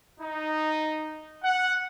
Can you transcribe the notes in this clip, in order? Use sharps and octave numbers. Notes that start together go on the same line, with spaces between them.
D#4
F#5